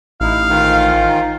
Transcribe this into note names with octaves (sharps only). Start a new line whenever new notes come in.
A1 D#4 E4 F5
G#2 D#3 F4